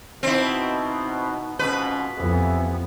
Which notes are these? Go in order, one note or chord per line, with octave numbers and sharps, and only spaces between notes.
B2 C4 D#4 E4
F2 G#2 B2 C#4 B4
F2 E3 B3 G4